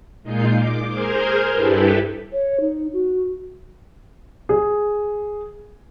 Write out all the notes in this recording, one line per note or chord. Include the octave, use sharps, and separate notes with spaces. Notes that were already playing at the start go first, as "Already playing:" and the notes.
A#2 G#3 D#4 F4 G6 C7
D6
G#4 A#4 C5 F6 G6 G#6
G2 E4 G4 A4 B4
C#5
D#4
F#4
G#4